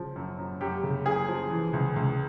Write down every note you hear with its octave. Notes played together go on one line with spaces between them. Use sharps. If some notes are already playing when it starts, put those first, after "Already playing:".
Already playing: C#3 F3
F#2
F#2
F#2 G4
C#3
F#2 G#4
F3
E3
C#2
C#2